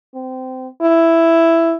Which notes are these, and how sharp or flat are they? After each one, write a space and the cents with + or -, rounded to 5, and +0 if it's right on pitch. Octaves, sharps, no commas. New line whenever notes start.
C4 -20
E4 +5